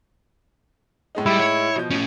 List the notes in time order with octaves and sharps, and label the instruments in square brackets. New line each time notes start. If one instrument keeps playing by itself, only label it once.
[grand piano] A2 G#3 D#4
[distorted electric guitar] G3 [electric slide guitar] E4
[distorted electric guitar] C#5
[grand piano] B2 F3 G6
[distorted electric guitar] A2 C#4